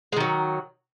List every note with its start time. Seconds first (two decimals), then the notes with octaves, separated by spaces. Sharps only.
0.12 G#3
0.16 D#3
0.20 F#3